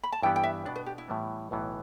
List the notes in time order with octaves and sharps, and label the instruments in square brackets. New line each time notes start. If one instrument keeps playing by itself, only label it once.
[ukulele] B5
A5
[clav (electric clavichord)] G2 E3 G3 B3 G4 [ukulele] G5
[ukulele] G5
E5
[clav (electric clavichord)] B2 B3 D4 [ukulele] D5
[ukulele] B4
G4
E4
[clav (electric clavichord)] A2 E3 G3 B3
B1 A2 E3 B3